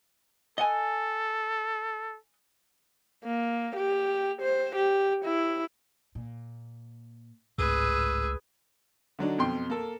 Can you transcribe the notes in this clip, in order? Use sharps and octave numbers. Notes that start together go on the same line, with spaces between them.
A4 D#5 F#5 G#5
A#3
G4
C5
G4
E4
A#2
G#1 C#2 A2 G#4 B4 E6
D3 F#3 D4 D#4
F2 B2 G5 C6
A#3 A4